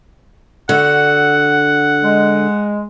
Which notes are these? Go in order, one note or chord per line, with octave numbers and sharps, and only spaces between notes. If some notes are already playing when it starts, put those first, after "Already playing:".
D3 F#4 F#5
G#3